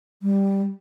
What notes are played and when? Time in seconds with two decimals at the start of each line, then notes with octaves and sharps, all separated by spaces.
0.22 G3